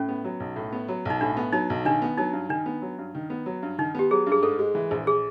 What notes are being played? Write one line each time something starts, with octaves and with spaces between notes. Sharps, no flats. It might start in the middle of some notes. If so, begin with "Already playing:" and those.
Already playing: A2 C#4
B3
F#3
B1
A2
B3
F#3
B1 D#4
A2 D4
B3
F#3 D#4
B1
D#3 D4
B3
F#3 D#4
G2
D#3 D4
B3
F#3
G2
D#3
B3
F#3
G2
D#3 D#4
B3 G4
F#3 G#4
G2
G#4
G#2 A4
G#3
E3
A#1
G#4